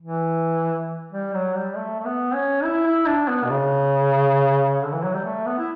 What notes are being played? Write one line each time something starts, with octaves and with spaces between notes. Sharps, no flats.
E3
G3
F#3
G3
A3
A3
B3
C#4
E4
E4
D4
B3
B2
C#3
D3
E3
F#3
G3
A3
B3
E4